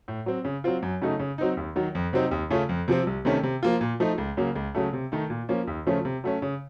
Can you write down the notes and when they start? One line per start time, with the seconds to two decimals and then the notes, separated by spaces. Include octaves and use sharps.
0.08 A2
0.26 F#3 C4
0.45 C#3
0.64 F#3 C4 F4
0.82 F#2
1.02 C#3 F#3 A3 D#4
1.19 C#3
1.38 F#3 C4 D#4
1.57 D#2
1.76 D#3 F#3
1.95 F2
2.13 C3 F#3 C4 D#4
2.31 D#2
2.50 C#3 A3 C#4 F4
2.69 F2
2.88 C3 F3 C4
3.07 C2
3.25 C3 D#3 A3 C#4
3.43 C3
3.63 F3 A#3 F4
3.81 A#2
4.00 F3 A3 D#4
4.18 C#2
4.37 C#3 F#3 A#3
4.56 C#2
4.75 C#3 F#3 A3
4.93 C3
5.12 D#3 A3 D#4
5.30 A#2
5.49 F3 A#3 C#4
5.67 D#2
5.86 C#3 F3 A3 C#4
6.05 C3
6.24 F#3 A3 C#4
6.42 C#3